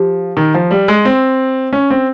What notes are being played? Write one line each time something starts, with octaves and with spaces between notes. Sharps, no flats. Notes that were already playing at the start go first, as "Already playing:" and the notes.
Already playing: F3 G4
D#3
F3
G3
G#3
C4
C#4
C4